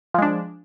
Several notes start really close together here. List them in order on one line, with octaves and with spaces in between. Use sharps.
F3 G#3 D4